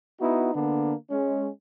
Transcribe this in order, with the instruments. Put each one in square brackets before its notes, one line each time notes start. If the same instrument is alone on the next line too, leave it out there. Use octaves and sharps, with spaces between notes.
[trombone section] B3 D#4 E4 F#4
D3 A#3 B3 D4
G#3 C#4